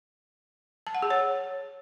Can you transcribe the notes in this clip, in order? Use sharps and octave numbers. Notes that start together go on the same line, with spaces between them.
A5
F#5
G#4
C#5